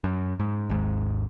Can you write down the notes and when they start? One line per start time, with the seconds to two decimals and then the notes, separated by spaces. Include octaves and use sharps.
0.04 F#2
0.40 G#2
0.69 G#1 D#2 G#2